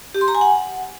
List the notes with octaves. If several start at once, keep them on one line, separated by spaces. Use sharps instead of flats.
G4
C6
A#5
G#5
F#5